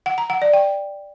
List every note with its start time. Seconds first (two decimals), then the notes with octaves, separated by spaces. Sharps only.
0.06 F#5
0.18 A#5
0.30 F#5
0.42 D5
0.53 G5